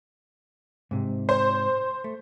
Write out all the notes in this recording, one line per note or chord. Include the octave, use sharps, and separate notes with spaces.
G#2 C3
C5
A3